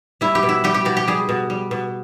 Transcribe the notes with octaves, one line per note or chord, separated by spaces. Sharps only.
G3 E4
G4
B2
E4
G3 G4
G4
B2 G4
G4
G3 G#4
B2
G3
B2